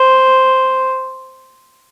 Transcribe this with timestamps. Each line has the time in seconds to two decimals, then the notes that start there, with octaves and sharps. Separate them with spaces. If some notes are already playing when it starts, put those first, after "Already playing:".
Already playing: C5